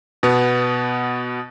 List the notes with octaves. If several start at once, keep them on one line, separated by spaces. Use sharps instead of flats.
B2 B3